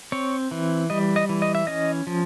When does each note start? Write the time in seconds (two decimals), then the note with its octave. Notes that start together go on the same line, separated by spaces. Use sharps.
0.12 C4 C#5
0.51 E3
0.90 G3 D#5
1.16 D#5
1.29 E3
1.42 D#5
1.55 E5
1.67 C#4 D#5
2.07 F3